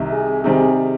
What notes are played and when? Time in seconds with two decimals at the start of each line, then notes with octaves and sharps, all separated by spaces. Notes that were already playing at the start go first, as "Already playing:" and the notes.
Already playing: C2 C3 D#3
0.13 G#4
0.44 C3 D#3 G3 C4 G#4